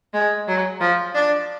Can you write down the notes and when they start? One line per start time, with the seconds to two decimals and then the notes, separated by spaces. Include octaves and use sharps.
0.14 G#3
0.48 F#3
0.81 F3
1.15 D4